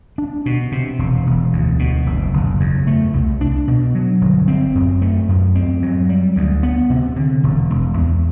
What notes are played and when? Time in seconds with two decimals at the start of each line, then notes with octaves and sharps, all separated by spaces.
0.18 D4
0.46 B2
0.72 C3
0.99 E1
1.26 E1
1.53 D2
1.79 B2
2.06 F#1
2.33 F#1
2.60 E2
2.87 A3
3.14 C2
3.41 D4
3.67 B2
3.95 F#3
4.21 G1
4.48 C4
4.75 F#2
5.02 A3
5.29 F#2
5.55 C4
5.83 F#3
6.09 G3
6.36 D2
6.63 B3
6.90 C3
7.16 D3
7.43 E1
7.70 E1
7.97 E2